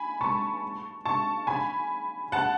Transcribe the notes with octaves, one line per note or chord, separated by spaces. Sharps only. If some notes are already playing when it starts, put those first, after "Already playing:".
Already playing: G#5 B5
A5 C#6
A5 C#6
G#5 B5
F#5 A5